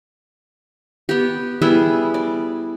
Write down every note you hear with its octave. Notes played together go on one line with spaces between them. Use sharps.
B3 G4
G3 B3 E4 G#4
D5